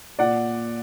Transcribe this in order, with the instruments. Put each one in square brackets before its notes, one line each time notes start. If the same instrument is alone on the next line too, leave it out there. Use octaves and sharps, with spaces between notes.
[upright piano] A#2 D5 F#5